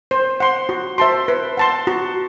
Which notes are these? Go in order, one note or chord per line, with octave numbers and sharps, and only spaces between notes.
C5
F#5 C6
F#4
C5 E5 A5 C6
B4
F#5 A5 C6
F#4